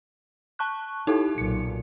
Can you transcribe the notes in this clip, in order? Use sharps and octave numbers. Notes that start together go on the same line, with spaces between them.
A5 C#6 F#6
D#4 E4 G4 A4
B1 A#2 C#7